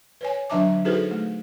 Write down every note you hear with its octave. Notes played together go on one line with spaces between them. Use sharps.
B4 C#5 G#5
D3 F#3 D4 E5 A5 D6
D#4 F#4 G#4 A4 B4 C5
A3